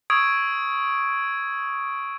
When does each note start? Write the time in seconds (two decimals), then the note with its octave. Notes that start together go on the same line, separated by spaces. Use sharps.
0.10 C#6 D#6 E6 G#6 D7